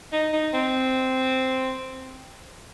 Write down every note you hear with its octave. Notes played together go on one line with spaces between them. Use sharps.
D#4
D#4
C4